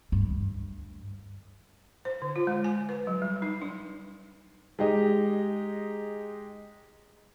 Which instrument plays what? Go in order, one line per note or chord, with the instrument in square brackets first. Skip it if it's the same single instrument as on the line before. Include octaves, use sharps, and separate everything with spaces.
[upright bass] D2 G2
[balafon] C5
D3
F4
G#3
G#5
B4
F#3
G3
D#4
D4
[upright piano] G#3 D#4 G4 D#5